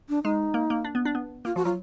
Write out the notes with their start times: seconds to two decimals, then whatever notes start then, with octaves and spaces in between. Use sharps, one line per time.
0.09 D4
0.24 G#3 D#4
0.54 A#3
0.70 A#3
0.84 D4
0.95 B3
1.05 D4
1.15 B3
1.45 A#3 F4
1.56 F3 F#4
1.65 F#3 F4